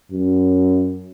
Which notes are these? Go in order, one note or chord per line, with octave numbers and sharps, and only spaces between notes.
F#2